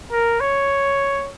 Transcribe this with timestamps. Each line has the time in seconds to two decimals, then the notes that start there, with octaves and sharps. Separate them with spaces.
0.12 A#4
0.40 C#5